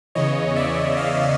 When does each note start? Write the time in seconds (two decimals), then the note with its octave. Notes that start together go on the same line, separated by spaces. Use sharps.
0.15 E2 C#3 E3 C#5 D#5
0.56 D5 E5
0.97 D#5 F5